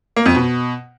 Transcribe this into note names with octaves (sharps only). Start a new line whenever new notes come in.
A#3
F2
B2